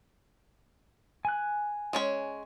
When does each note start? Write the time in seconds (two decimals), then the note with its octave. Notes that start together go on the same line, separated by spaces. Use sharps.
1.25 G#5 F#6
1.93 G#3 C#4 C#5